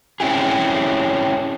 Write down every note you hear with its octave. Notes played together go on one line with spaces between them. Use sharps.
C4 C#4 E4 G4 G#4